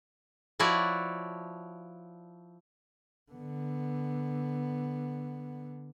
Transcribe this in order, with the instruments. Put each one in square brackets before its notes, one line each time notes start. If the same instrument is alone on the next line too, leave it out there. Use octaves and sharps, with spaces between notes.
[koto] F3 E4 F#4 C#5 D5
[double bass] D3 B3